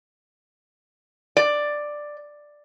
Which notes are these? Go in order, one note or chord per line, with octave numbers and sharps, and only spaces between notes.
D5